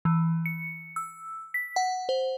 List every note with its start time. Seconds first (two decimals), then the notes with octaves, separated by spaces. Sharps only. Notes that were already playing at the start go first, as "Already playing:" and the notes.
0.05 E3
0.46 C#7
0.96 E6
1.54 B6
1.76 F#5
2.09 C5